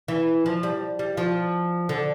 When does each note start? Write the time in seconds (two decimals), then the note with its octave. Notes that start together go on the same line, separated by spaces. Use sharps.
0.08 E3
0.46 F3
0.63 G3
0.99 G3
1.17 F3
1.89 D3